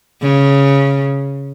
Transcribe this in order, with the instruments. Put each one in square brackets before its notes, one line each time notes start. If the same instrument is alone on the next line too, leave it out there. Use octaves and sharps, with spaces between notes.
[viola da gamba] C#3